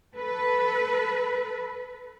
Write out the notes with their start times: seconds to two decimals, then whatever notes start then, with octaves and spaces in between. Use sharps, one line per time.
0.15 A4 B4